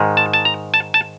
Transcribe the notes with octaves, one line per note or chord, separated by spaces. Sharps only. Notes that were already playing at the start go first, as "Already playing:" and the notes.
Already playing: G#2 D#3 G#3
A5
A5
A#5
A5
A5